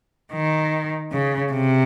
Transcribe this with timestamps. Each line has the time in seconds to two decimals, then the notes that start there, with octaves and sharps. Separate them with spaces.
0.33 D#3
1.12 C#3
1.53 C3